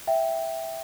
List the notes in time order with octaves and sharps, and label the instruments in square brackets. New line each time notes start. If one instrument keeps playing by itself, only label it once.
[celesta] E5 G5